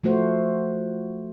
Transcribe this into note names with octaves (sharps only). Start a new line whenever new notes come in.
F3 A3 F#4 C5